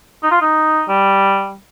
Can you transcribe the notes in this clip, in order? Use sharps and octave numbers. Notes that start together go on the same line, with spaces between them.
D#4
F4
D#4
G3